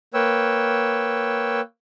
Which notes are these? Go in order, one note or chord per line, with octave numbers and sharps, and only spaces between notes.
A#3 B4 C#5 G5 E6